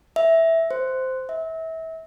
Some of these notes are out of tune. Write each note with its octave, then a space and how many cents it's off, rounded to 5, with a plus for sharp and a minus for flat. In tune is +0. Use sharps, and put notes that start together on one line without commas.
E5 -5
C5 -10
E5 -30